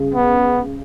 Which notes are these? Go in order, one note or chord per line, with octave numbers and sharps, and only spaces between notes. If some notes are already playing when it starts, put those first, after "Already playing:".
Already playing: C#3 G#4
B3